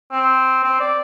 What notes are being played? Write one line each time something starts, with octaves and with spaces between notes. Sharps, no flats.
C4
C4
D5